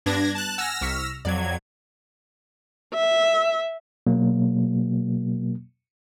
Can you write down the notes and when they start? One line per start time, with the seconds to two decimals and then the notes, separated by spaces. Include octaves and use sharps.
0.06 G2 B3 D4 G#6 A#6
0.35 A5 F#6
0.58 F#5 G#5 E6 F6 A#6
0.81 C2 C#6 B6
1.25 F2 F#3 D5 G#6
2.94 E5
4.07 B2 F#3 A#3